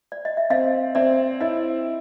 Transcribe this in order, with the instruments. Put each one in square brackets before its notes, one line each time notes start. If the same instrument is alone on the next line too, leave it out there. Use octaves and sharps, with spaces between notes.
[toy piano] D5
D#5
E5
[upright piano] C4 [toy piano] D#5 F5
[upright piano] C4 [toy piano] D5 E5
[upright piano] E4 [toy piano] C#5 D#5